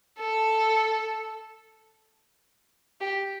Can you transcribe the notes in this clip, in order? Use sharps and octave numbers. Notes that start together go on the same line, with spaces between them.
A4
G4